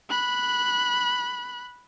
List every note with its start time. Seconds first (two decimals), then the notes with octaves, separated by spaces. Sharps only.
0.10 B5 F#6